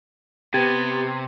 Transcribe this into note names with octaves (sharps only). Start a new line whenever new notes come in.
C3 B3 G4 G#6 A6